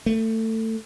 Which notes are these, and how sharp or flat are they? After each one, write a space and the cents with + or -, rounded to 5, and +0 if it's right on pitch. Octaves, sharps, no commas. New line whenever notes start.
A3 +20